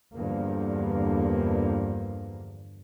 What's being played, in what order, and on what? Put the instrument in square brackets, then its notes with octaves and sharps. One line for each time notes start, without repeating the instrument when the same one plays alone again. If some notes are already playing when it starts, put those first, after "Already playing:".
[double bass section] E2 G2 D3 F3 A#3